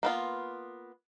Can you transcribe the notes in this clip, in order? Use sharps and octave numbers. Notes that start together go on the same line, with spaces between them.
A#3 B3 F4